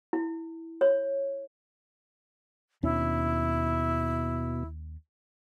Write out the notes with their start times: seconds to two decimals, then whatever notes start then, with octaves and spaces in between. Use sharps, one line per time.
0.13 E4
0.81 C#5
2.83 D#2 B2 C#4 D4 E4